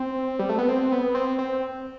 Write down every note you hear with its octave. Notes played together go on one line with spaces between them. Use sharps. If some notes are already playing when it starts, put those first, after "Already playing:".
Already playing: C4
G3
A3
B3
C4
B3
C4
C4